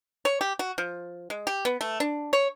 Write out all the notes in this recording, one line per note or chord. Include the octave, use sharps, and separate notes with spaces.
C#5
G4
F#4
F3
G#3
G4
B3
A3
D4
C#5